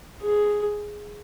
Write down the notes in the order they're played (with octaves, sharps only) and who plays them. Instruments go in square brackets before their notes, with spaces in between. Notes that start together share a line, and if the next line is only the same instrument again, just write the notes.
[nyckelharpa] G#4